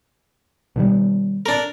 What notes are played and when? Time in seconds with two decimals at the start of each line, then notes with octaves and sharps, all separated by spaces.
0.76 B2 D#3 G3
1.46 D4 A#4